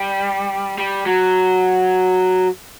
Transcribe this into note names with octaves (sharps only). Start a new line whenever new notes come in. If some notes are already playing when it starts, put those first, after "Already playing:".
Already playing: G3
G3
F#3